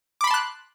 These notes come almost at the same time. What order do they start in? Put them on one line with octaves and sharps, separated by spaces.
D6 B5 C6 A5 F#6